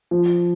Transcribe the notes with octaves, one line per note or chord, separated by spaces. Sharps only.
F3